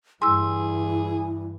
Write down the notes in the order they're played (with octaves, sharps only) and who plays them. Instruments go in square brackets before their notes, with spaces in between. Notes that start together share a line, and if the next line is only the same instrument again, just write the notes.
[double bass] G2 E3 [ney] E4 [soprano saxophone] G#4 [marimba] C6 E6